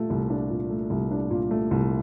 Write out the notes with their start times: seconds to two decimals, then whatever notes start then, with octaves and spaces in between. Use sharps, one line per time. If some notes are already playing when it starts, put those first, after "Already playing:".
Already playing: A#2 A3
0.10 C2
0.30 D4
0.50 A#2
0.70 A3
0.90 C2
1.11 D4
1.31 A#2
1.51 A3
1.71 C2